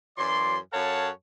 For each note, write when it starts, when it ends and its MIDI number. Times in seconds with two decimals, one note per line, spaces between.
0.18 0.56 42
0.18 0.56 52
0.18 0.56 54
0.18 0.56 74
0.18 0.56 84
0.73 1.10 42
0.73 1.10 69
0.73 1.10 73
0.73 1.10 77
0.73 1.10 78
0.73 1.10 81